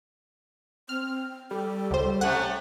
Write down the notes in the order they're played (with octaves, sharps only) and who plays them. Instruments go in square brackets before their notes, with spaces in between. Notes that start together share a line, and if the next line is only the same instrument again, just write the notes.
[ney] C4 [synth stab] F6
[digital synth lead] G3 [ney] A4
[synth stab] C#2 C5
[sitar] C3 A3 C#4 [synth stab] F#5